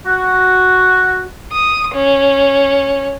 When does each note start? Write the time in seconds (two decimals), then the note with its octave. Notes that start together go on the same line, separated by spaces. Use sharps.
0.06 F#4
1.53 D#6
1.94 C#4